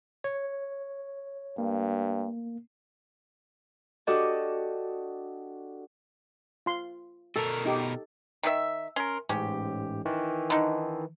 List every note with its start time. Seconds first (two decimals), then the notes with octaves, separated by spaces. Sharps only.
0.24 C#5
1.58 G2 A#3
4.07 D4 F#4 G4 A4 D#5 D6
6.66 F4 C6
7.36 B2 A4 A#4
7.65 D#4 G4
8.43 D#3 G4 E5
8.96 C#4 A#4 C6
9.29 A1 G#2 C#4 G4
10.05 D#3 E3
10.50 D3 D#4